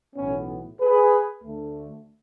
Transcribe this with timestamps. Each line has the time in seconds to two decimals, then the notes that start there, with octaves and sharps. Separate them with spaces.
0.16 B1 A2 E3 B3 C#4
0.80 G#4 B4
1.44 D2 D3 A3